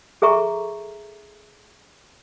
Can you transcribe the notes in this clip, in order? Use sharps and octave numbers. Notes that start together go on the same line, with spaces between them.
G#4 A4 E5 A#5 C#6